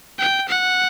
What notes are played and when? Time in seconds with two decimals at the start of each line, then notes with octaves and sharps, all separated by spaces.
0.19 G5
0.49 F#5